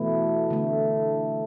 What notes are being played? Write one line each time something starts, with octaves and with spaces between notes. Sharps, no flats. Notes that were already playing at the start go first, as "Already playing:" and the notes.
Already playing: B2 E3 A3 E4
D3 A3